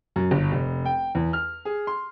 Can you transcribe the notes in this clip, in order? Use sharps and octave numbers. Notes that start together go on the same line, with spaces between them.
F#2
G1
F1
G5
E2
F6
G#4
C6